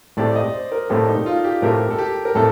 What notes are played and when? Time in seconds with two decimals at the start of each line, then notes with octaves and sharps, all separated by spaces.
0.17 A2 A3 C4 G4 D5
0.35 D#5
0.53 C5
0.72 A#4
0.90 A2 A3 C4 G4 A4
1.08 D#4
1.26 F4
1.44 G4
1.62 A2 A3 C4 G4 A#4
1.91 A4
1.98 G4
2.25 A#4
2.35 A2 A3 C4 A4